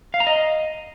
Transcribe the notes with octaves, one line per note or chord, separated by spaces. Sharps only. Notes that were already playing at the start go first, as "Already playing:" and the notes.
F5
A#5
D#5